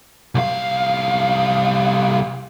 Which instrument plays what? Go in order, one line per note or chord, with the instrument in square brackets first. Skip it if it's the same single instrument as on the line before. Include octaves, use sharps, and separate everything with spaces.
[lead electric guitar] C2 F5